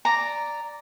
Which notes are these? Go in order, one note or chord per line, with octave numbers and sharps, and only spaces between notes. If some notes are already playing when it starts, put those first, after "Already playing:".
D5 A#5